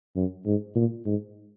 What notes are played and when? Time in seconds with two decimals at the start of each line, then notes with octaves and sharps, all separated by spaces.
0.16 F#2
0.46 G#2
0.75 A#2
1.05 G#2